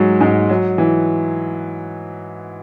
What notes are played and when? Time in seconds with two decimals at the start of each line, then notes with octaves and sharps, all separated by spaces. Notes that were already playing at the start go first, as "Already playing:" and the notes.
Already playing: G#2 F#3 G#3
0.20 G#2 G#3
0.49 F#3
0.78 E3